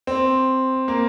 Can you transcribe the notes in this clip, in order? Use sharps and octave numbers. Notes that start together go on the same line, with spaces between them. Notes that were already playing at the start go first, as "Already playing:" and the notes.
C4
A#3